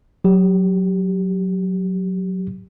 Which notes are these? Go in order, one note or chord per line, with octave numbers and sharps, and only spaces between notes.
F#3 G4